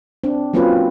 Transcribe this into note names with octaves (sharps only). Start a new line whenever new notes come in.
C4 D4
F#3 A#3 C4 C#4 F4 B4